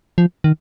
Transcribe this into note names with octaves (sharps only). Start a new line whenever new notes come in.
F3
D#3